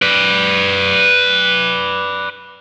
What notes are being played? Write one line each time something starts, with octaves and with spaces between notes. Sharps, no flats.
B4 D5